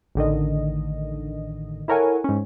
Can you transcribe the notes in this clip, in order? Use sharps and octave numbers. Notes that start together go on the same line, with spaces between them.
A1 D3 D#3 D#5
E4 A4 A#4 C#5 F#5 G#5
G#2 C#4